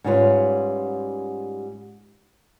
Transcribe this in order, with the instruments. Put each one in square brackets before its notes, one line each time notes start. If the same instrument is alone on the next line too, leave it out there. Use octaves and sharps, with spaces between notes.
[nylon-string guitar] G#2 G3 C#4 F4 F#4 B4